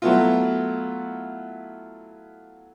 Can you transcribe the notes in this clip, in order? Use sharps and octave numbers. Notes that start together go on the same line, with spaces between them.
F#3 A3 B3 E4 F4